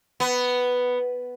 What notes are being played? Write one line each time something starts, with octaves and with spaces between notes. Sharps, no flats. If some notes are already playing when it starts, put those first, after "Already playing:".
B3